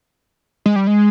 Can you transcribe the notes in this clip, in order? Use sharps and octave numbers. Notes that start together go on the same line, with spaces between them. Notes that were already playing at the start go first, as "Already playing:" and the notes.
G#3
G3
G#3